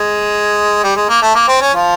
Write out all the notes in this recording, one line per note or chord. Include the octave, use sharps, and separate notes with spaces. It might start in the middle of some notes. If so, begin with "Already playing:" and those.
Already playing: G#3
G3
G#3
A#3
A3
A#3
C4
C#4
F3 F4